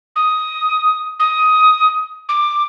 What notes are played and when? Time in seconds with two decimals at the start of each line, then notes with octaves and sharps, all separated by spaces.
0.16 D#6
1.19 D#6
2.29 D6